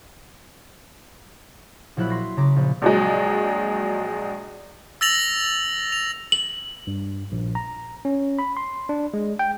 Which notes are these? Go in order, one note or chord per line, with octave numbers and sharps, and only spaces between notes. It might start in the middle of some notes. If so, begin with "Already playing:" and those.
A#1 F#3 E4 F#6 B6
C6 A#6 B6
C#3 A#5 D6 B6
A#1
A#1 F#3 G#3
E6 A6 A#6 F7 F#7
F7
F#7
G2
A#1
A#5
C#4
B5
C6
D4
G#3
G5